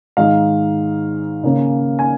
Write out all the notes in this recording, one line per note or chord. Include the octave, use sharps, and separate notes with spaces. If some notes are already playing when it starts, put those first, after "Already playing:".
G#2 D#3 G#3 D#4 F5
C#3 A#3 C#4
G#5